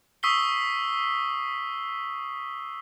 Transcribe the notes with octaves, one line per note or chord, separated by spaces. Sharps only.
C#6 D#6 E6 B6 C7 G7